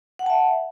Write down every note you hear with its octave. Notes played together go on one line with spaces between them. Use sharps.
E5 F#5 G5 A5